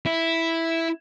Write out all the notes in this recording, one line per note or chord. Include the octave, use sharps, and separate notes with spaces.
E4